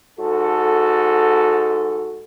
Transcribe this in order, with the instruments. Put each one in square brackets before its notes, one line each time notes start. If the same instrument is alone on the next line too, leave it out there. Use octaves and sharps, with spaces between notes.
[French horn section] G#2 F#4 A4